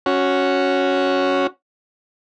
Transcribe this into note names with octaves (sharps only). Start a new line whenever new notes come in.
C#4 F#4